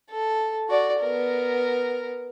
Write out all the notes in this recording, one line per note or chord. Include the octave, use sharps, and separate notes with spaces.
A4
F#4 D5
B3 A#4